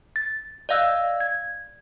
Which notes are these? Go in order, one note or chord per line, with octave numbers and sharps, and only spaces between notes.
A6
D5 D#5 F5 E6 F#6
G#6